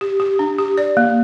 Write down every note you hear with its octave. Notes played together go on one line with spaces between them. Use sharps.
G4
G4
D4
G4
D5
A#3